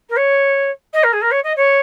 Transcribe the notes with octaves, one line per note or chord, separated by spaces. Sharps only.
A#4
C#5
D#5
A#4
G#4
A#4
C#5
D#5
C#5